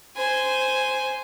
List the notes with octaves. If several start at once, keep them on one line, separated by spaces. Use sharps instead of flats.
C5 G#5